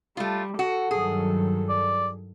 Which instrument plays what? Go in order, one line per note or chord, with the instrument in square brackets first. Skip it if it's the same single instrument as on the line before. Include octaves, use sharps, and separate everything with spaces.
[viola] G3 [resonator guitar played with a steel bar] A3 F4
[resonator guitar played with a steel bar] F#4 [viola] A4
[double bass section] G2 D#3 F#3 [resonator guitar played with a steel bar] G#4
[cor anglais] D5